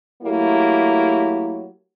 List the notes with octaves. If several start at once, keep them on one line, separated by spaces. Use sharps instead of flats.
F#3 A3 A#3 E4 G4